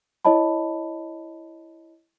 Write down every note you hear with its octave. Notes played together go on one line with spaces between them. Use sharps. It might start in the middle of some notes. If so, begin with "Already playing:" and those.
E4 C#5 D#5 A5 B5